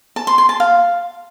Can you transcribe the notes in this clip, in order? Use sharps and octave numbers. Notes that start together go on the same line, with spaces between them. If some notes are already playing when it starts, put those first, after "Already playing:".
A5
C6
C6
A5
F5